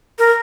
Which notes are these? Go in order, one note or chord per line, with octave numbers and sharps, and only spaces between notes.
A#4